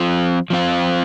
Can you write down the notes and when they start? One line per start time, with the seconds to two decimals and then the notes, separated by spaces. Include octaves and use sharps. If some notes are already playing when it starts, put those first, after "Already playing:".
Already playing: F3 C4 F4
0.50 F3 C4 F4